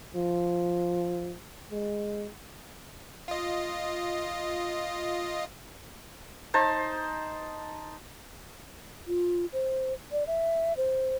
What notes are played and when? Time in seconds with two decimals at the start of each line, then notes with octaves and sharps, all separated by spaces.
0.15 F3
1.71 G#3
3.28 F4 D#5
6.54 D#4 C5 A5
9.07 F4
9.53 C5
10.12 D5
10.27 E5
10.77 C5